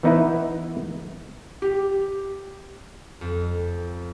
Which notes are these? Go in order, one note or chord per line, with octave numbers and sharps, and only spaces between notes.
E3 B3 D#4 E4 B4 E5
G4
F2